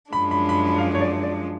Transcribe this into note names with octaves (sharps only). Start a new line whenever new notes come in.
F#2 F3 G#3 D4 B5
B5
B5
B5
F5
C#5
D5
D5